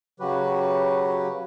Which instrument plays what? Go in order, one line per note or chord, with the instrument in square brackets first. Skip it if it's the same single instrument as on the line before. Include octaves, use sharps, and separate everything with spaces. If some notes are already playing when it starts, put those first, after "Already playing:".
[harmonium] C#3 F#3 F#4 G4 B4